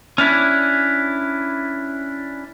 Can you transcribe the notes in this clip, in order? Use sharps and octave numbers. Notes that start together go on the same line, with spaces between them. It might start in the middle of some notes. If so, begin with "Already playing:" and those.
C#4 D4 E4